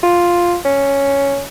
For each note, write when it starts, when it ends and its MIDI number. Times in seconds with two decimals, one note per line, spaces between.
0.03 0.57 65
0.65 1.42 61